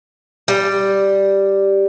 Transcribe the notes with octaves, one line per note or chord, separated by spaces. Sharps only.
G3